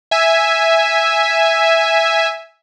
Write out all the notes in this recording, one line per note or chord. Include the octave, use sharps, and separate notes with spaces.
E5 G#5